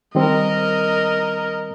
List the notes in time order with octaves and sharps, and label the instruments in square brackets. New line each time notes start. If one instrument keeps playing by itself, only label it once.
[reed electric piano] D#3 G3 C4 [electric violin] A#4 D#5